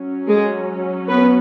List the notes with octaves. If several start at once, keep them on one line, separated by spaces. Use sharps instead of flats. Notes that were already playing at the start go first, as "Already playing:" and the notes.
Already playing: F#3 C#4
G#3 G#4
B3 B4